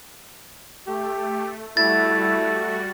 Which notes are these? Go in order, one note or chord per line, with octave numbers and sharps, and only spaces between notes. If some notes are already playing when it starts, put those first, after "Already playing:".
A3 G4
G3 A3 E4 F#4 A6